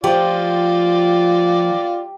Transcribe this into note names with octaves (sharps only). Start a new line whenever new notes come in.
F3 F4 G4 D5